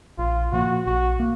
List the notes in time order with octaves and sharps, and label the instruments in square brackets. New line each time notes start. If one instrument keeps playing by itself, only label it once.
[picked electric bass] A#1 [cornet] F4
[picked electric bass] A#2 F3 A#3 [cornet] F#4
[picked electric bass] A#1 [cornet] F#4
[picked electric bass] A#3